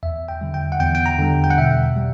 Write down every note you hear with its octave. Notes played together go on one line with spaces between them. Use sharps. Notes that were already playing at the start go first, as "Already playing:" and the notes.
E2 E5
G5
D3 G3
G5
F#5
E2 G5
G5
A#5
D3 G3
G5
F#5
B2 E5
G3